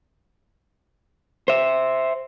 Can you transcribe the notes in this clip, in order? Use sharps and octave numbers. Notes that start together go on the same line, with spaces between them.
C5 E5